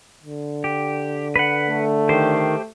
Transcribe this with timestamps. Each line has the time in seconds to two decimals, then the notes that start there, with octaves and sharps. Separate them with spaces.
0.24 D3
0.64 G4
1.36 B4 F#5
1.69 A3
2.09 D#3 G4 C5